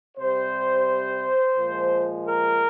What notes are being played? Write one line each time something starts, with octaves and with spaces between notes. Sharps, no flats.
C3 G3 C5
A#2 F3 G#3
A#4